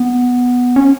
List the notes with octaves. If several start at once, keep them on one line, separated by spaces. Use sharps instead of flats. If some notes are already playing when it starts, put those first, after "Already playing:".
Already playing: B3
C#4